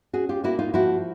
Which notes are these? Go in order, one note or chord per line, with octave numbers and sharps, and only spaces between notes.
C#4 F#4 G#4
F4 G4
A#3 E4 F#4
D#4 F4
F3 E4 F#4